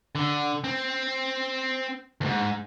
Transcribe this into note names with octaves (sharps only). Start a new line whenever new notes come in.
D3
C4
D2 G#2